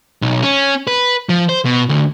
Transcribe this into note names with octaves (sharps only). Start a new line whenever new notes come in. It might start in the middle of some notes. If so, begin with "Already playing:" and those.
B1
C#4
B4
F3
C5
B2
D2